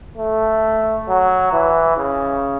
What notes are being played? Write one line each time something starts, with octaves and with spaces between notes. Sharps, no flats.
A3
F#3
E3
C#3